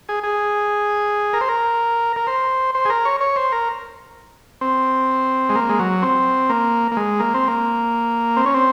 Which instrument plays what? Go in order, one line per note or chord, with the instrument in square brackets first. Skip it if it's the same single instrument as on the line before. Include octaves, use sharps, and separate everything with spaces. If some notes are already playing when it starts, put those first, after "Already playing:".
[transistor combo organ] G#4
G#4
A#4
C5
A#4
A#4
C5
C5
G#4
A#4
C#5
C#5
C5
A#4
C4
G#3
A#3
G#3
F#3
C4
A#3
A#3
G#3
A#3
C4
A#3
C4
C#4
C4